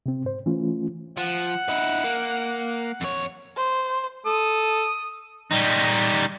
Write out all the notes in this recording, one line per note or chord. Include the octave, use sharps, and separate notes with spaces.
C3 C4
G#2 C5
E3 A3 C#4 F4
F3 F#5
D#4 E4
A#3
F2 C#5
C5
A4 D#6
G3 D#4